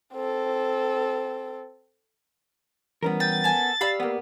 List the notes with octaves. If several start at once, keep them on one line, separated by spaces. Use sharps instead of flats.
C4 A4
E3 G3 B3 C#4 A#4
G5 A6
A4 G#5
G4 D5 F5 B5 E6
A#3 B3